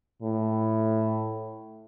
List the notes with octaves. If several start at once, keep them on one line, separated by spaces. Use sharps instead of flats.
A2